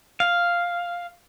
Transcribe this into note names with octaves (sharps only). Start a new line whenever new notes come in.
F5